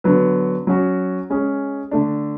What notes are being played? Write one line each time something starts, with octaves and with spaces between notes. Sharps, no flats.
D3 F#3 B3
F#3 C#4 F#4
G#3 C#4 G#4
D3 A3 D4